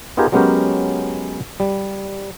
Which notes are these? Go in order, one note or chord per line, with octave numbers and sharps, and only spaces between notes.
B3 D#4 F4 G4 G#4 A#4
F#3 G#3 B3 C#4 G4 A#4
G3